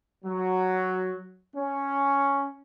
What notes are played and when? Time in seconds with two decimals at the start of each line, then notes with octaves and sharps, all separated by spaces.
0.24 F#3
1.55 C#4